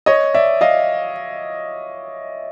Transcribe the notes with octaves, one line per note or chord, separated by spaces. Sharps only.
C#5 D#5
D5 E5
D#5 F5